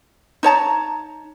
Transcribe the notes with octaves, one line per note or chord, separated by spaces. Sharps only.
D#4 C#5 A5 A#5